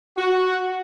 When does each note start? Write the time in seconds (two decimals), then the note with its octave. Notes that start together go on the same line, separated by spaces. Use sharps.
0.17 F#4